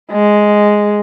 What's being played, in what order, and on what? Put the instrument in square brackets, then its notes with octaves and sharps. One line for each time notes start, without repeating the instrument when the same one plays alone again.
[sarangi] G#3